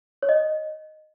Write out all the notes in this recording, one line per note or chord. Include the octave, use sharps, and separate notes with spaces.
C#5
D#5